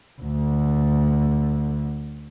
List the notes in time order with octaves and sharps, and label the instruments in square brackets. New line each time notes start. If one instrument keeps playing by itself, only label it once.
[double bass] D2 D3